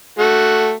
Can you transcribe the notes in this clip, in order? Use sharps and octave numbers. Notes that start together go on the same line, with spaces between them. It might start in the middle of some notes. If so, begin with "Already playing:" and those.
A3 F#4